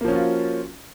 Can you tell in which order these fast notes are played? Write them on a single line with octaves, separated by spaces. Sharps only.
A#3 F3 C#4 F#4 F4